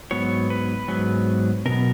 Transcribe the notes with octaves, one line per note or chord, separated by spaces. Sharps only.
G#2 F#3 B3 C#5
B4
G#2 F#3 B3
B2 F#3 B3 A#4